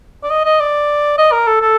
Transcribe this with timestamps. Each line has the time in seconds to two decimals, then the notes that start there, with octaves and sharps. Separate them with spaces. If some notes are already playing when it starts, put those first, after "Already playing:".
0.23 D5
0.30 D#5
0.45 D#5
0.60 D5
1.18 D#5
1.32 A#4
1.47 A4
1.61 A4